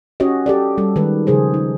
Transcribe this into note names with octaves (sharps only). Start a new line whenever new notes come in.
C#4 F#4 G4 C#5 D#5
G4 A4 D5
G3 A4
D#3 G#3 B4
C#3 F3 G#4 C5
D#4